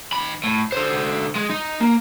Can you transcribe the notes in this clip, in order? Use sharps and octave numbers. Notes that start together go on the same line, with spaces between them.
D#3 B5
A2
D3 C5
G#3
D#4
A#3